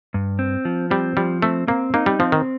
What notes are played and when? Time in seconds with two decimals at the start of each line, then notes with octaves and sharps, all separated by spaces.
0.14 G2
0.39 C4
0.65 F3
0.91 G3 C4
1.17 F3 G3
1.42 A3 C4
1.68 A#3 C4
1.94 A#3 D#4
2.06 G3
2.19 F3 C4
2.32 D#3